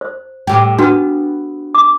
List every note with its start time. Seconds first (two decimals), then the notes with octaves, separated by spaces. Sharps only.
0.01 C5
0.47 A2 G4
0.79 B3 D4 F#4 B4
1.75 D6